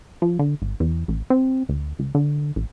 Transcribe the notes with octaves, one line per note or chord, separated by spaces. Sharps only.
F3
D3
G#1
E2
A1
C4
D2
C#2
D3
A1